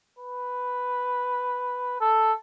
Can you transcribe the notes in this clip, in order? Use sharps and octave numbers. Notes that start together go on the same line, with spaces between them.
B4
A4